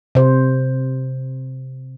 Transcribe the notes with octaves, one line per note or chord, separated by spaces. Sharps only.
C3 C5